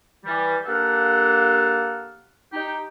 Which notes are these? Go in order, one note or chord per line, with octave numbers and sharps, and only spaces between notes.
E3 G3
A#3 D4 G4 A4 F5 F#5
D#4 G4 G5